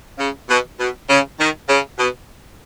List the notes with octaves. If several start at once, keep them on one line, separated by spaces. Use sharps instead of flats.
C#3
B2
B2
C#3
D#3
C#3
B2